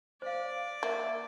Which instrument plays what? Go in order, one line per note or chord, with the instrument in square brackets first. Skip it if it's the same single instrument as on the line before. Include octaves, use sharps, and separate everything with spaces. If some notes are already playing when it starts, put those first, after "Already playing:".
[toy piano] C5 F5 [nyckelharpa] D5
[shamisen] A#3 [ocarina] E5